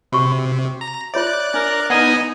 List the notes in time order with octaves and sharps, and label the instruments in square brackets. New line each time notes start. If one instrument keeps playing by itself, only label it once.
[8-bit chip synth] C3 [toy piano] F#4 C#6
[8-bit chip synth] A#5
[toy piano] F4 C#5 E5 [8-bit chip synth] D5 F#6
[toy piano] D4 [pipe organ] A#4
[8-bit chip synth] B3 D#4 [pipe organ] D#5 G#5 [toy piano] F#5